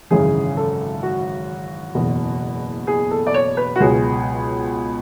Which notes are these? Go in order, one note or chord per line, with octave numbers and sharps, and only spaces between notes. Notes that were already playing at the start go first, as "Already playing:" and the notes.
G#1 F#2 C#3 E3 G#4
A4
F#4
F#1 E2 B2
G#4
A4
D5
C#5
B4
F#4
C#2 B2 F#3 G#4